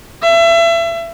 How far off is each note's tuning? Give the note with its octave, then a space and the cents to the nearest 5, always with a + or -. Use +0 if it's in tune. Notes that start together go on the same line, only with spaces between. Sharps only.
E5 +30